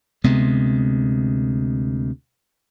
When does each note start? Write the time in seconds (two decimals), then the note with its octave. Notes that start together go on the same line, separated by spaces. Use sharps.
0.24 D2 C3 G#3 B3